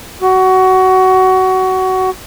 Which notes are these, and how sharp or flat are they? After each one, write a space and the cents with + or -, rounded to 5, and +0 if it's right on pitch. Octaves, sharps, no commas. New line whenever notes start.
F#4 +20